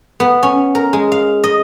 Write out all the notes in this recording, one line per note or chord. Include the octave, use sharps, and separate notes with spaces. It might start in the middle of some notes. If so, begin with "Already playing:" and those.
B3
C#4
A#4
G#3
F5
D#5